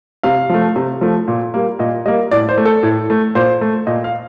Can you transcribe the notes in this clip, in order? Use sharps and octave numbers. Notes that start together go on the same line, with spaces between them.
C3 F5
F3 A3
C3
F3 A3
A#2
G3 A#3
A#2 D#5
G3 A#3 D#5
A2 D5
C5
A3
A4
A2
A3
A#2 C5
A3
A#2 D#5
F5